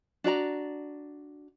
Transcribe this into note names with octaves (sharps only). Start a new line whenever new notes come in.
D4 F#4 D5 A#5